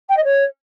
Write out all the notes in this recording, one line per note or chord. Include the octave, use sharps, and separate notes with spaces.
G5
D#5
C#5